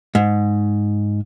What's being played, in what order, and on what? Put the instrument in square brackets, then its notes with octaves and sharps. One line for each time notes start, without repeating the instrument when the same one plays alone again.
[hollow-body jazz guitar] G#2